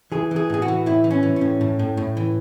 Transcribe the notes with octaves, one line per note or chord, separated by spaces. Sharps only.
E3 G#4
E3 G#4
A2 G#4
F#4
E3
A2 E4
E3
C#4
E3
C#4
A2
A2
A2
A2
E3